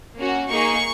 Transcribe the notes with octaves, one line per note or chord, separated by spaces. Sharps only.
A#3 C#4 F#4
A#3 D#4 G#4 C#6